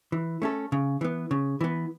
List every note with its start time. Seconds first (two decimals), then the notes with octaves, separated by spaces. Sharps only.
0.12 E3
0.42 A3 C#4 A4
0.72 C#3
1.01 E3 B3
1.31 C#3
1.61 E3 B3